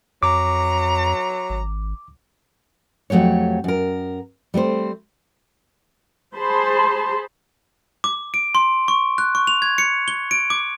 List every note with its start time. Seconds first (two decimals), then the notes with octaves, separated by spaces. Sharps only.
0.23 F2 F#3 A#5 D6
1.50 G#1
3.10 F2 F#3 A3 G4 C#5
3.64 F#2 A#4
4.54 G3 A3 C4 C5
6.35 G#4 C5 A5 B5 C6
8.04 D6
8.34 D7
8.55 C6
8.88 C#6
9.18 F#6
9.35 C#6
9.47 F7
9.62 G#6
9.78 C#7
10.08 G7
10.31 D7
10.50 D6